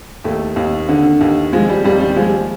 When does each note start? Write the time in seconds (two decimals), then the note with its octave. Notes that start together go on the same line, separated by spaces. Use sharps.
0.24 D#2 A3
0.56 D#2
0.89 D3
1.21 D#2
1.53 F3 G#3
1.69 G3
1.84 D#2 G3
2.01 G3
2.16 F3 G#3